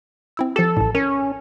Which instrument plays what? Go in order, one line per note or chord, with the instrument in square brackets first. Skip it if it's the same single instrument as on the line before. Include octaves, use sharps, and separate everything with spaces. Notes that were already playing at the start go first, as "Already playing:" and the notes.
[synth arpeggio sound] C4 E4 E6
[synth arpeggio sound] F3 G4 [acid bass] A4
[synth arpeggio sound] A1 A2
[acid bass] C#4 [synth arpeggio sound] A#4